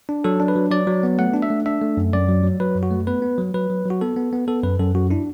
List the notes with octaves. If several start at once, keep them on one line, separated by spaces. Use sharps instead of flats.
D4
F#3 A4
D4
B4
F#3
F#3 D5
F#3
B3
A3 F#5
D4
E5
A3
D4 E5
A3
F#2
F#2 D5
F#3
F#3
F#3 B4
F#2
F#4
A3
B3 B4
B3
F#3
F#3 B4
F#3
F#3 F#4
B3 A4
B3
B3
B3 A4
F#2 B4
F#2 A4
F#2 F#4
D4 E4